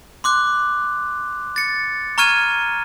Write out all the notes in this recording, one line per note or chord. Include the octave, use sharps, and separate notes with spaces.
C6 D6 F#6
A6 C#7
A#5 C#6 F6 G#6 D#7